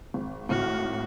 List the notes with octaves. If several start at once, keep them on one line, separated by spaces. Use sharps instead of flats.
G#1
G#1 A2 F#4 F6